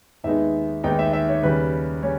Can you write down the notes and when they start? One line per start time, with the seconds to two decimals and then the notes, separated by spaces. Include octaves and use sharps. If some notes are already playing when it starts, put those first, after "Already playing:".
0.24 D#2 D#3 G#3 B3 D#4 E5
0.84 D#2 D#3 G#3 B3 D#4 G5
0.99 E5
1.13 E5
1.29 C#5
1.43 D#2 C#3 G3 C#4 B4
2.03 C#3 G3 C#4 C#5